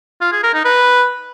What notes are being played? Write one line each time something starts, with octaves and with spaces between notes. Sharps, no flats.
F4
G#4
A#4
D#4
B4